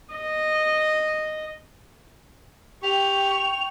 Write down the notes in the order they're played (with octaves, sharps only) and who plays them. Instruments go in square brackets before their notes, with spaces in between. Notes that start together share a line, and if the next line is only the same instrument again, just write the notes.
[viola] D#5
[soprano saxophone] G4 [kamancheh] G5 C#6 [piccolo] F7